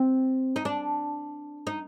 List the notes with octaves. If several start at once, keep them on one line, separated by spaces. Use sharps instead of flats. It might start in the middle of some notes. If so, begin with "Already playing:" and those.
Already playing: C4
D#4
D4
D#4